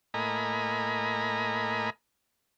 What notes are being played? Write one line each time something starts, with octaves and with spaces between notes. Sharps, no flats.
A2 A#3 D#5 G#5 A#5 B5